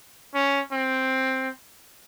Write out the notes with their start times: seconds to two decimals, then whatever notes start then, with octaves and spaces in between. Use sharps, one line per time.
0.34 C#4
0.72 C4